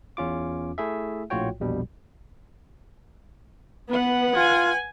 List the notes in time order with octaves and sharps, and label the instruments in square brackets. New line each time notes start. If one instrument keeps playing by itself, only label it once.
[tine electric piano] E2 C#4 F4 D6
A3 E4 G#4 E5
A#1 A2 F4 F#4 C#5 G5
A#1 E2 B2 G3
[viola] B3 [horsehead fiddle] B4 F#5
[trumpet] F4 [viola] G#5